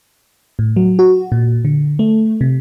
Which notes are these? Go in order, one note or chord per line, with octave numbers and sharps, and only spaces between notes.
A2
F#3
F#4
A#2
D3
A3
C3